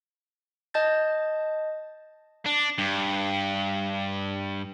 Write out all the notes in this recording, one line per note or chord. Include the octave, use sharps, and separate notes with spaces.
D#5 A5 G6 A6
D4
G2